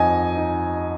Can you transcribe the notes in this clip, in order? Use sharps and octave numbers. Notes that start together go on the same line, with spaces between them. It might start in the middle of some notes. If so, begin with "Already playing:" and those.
Already playing: F2 D#4 D#5 G#5
D#4